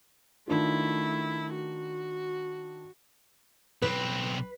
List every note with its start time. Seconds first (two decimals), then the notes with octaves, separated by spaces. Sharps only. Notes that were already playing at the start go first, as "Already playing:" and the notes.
0.48 D#3 A3 D4 E4 F4
1.54 F#4
3.82 B1 C4 B4